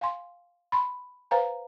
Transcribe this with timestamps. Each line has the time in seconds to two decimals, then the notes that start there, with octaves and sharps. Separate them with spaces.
0.01 F5 G#5 C6
0.72 B5 C6
1.31 B4 C5 F5 G#5 A#5